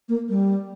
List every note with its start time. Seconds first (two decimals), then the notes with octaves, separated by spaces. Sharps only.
0.09 A#3
0.29 G3